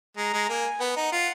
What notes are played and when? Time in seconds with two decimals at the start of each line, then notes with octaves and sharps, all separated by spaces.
0.17 G#3 A#5
0.33 G#3
0.49 A#3 G#5
0.80 B3 F#5
0.96 D#4
1.12 F4